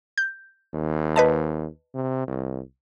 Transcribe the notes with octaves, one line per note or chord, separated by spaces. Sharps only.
G6
D#2
B4 D#5 A5
C3
C2